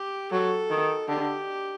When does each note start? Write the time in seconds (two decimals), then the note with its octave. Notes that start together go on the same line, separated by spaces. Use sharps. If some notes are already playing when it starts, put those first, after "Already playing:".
Already playing: G4
0.32 F#3 A4
0.70 D#3
1.09 D3 G4